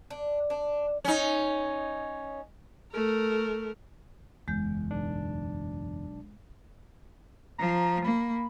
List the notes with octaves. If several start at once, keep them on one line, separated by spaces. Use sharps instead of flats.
D4
D4
C#4 D#4
A3 A#4
F#1 E2 G#3 G6
B1 D4
F3 A#5
A#3 B5